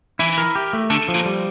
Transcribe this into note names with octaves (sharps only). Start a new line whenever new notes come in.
E3 E4
A#4
G4
A3
D3 A4
F3
A#2
G3